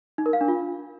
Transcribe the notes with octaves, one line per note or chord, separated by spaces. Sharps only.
D#4
A#4
F5
D4
F4